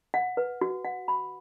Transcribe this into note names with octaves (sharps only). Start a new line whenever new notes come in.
F#5
B4
F#4
F#5
B5